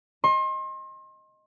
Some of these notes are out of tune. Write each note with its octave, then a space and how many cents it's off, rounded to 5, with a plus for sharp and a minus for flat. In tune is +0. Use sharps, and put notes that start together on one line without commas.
D#5 +0 C6 +35